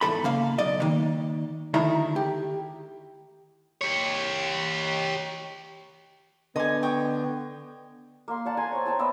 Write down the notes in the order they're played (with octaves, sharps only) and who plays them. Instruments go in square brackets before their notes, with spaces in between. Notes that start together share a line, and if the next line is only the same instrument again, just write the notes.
[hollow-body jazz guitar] E2 G#2 B2 A4 B5
C#3 A#3 F5
B1 D5 D#5
D#3 A#3
D2 D#3 A3 E4 A#5
G4
[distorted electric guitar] G4 C#5
[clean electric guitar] D3 [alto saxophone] B3 [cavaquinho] D#5 G#5
[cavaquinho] G5 C#6 D#6
[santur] A#3 C6
D5 F#5 A5
G#5 A#5 C6
C4 C#5
G5 A5 A#5
B3 D5 E5 G5